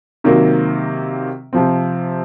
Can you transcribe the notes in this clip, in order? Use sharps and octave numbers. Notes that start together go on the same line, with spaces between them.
C3 D#3 F#3 A#3
C3 F3 C4